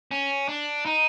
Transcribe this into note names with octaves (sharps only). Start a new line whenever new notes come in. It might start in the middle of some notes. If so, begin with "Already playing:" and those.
C#4
D4
D#4